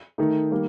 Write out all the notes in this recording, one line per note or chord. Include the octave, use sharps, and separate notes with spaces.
D#3 A3 D#4
D#3 G3 A#3